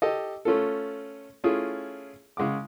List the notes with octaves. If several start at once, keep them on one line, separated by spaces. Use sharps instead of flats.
G4 A4 D#5
A3 C#4 F4 A4
A3 C#4 E4 F4 G#4
C#3 G#3 F#5 D6